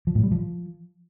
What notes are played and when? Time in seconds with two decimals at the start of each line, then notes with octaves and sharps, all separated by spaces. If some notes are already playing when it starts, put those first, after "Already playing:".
0.07 F3
0.15 A2
0.23 G3
0.31 F3